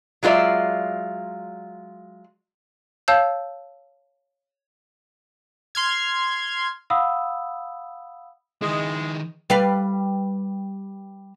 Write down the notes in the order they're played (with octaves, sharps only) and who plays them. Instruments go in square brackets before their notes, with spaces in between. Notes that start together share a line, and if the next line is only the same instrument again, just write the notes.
[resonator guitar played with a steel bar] F#3 G#3 F4 B4 D5 E5
[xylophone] C#5 F5 A5 E6 G6
[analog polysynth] C6 F6 G#6
[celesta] F5 F#5 B5 D#6 E6
[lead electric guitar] D#3 E4 [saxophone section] G#3
[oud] G3 B4 F5